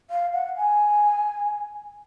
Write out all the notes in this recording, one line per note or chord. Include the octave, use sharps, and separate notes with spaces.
F5
F#5
G#5